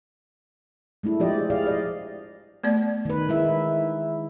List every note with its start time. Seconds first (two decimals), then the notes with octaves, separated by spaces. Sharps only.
1.03 G#3 A3 D4 E4
1.20 F3 F4 G4 D5 D#5
1.33 G#4
1.50 G4 G#4 D5 D#5 F5
1.67 D5 D#5
2.63 A3 B3 D5
3.05 D#3 B4
3.29 G#3 E4 E5